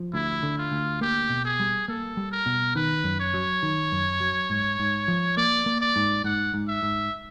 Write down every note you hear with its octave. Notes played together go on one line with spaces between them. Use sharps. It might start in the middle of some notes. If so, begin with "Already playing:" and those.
Already playing: F3
D2 E4
D3
F4
D2
A#3 G4
B2
G#4
G3
A#3 A4
G3
A#4
B2
D#3 B4
F#2
C#5
F#3
D#3
F#2
F#3
G#2
G#2
F3
A#3 D5
A#3
D5
G#2
G#2 F#5
G#2
E5
G#2